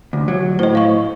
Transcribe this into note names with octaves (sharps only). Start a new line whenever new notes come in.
D2
F#3
A2 C5 D#5
F5 C#6